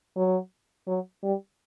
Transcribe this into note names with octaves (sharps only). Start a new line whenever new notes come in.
F#3
F#3
G3